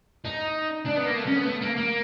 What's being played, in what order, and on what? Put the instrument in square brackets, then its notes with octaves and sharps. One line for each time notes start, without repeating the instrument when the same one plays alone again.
[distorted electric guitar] D#4
D4
B3
A#3
A3
C#4
B3
A3
A#3
A#3